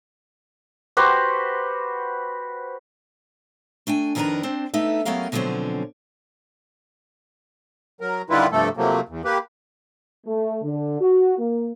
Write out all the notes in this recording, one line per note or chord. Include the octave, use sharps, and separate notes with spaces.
F#4 G4 B4 C5
A3 D4 G5 G#5
F2 D#3 D4 A#4 B4 A#5
C4 D4 C5
A3 B3 D#4 E5
F#3 B3 C#4 G4 A#4 F5
B2 D3 F3 F#3 C4 C#4
F#3 A#4
D3 D#3 G3 E4 F4 B4
G2 C3 F3 A3 A4
C3 F3 F#3 A3 A#3
E2
A#3 G4 B4
A3
D3
F#4
A#3